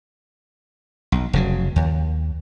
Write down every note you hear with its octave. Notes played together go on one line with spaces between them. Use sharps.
B1
F1 C#3 F#3
D#2